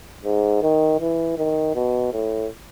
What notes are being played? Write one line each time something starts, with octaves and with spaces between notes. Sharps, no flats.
G#2
D#3
E3
D#3
B2
A2